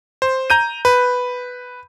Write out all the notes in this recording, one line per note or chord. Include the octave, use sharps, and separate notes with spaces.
C5
A#5 G6 D#7
B4